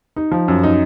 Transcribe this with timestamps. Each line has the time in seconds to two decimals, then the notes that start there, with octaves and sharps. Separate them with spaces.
0.16 D#4
0.31 F3
0.48 F#2
0.64 D#4